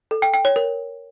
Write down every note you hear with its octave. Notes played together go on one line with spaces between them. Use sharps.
A4
G5
G5
C#5
A#4